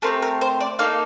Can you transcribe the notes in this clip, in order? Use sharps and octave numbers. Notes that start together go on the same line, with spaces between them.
A3 C4 G4 A#4
A#4
C5
D5
A#3 D#4 A4 F5